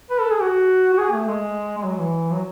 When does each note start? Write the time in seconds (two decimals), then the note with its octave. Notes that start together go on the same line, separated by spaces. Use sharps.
0.10 B4
0.20 A4
0.31 G#4
0.41 F#4
0.94 F#4
0.98 G#4
1.12 A3
1.28 G#3
1.78 G#3
1.84 F#3
1.98 E3
2.33 F#3